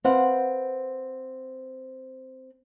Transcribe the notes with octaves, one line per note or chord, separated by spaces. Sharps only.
C4 B4 C5 F5 F#5